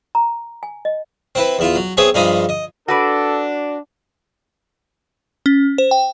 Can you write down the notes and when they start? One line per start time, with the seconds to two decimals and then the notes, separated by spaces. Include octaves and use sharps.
0.15 A#5
0.63 G#5
0.85 D#5
1.35 C4 E4 B4
1.59 E2 E4 F4
1.76 F#3
1.97 B3 C4 G#4 C#5 E5
2.14 G2 F3 G#3 D#4 D#5 B5
2.49 D#5
2.88 D4 F#4 A4 B4 D5
5.46 C#4
5.78 C5
5.91 G5